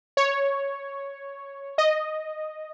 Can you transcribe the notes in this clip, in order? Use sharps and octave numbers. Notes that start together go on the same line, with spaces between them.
C#5
D#5